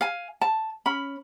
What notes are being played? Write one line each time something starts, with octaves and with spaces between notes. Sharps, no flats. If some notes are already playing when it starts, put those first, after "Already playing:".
F5 G#5
A5
C#4 B5